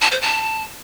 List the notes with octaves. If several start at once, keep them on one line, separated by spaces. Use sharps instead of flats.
A5
C5
A5